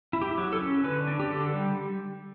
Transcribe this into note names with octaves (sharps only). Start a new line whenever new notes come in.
E4
G4
F#3
A4
C#4
D3 B4
D4
G4
D3 A4
G3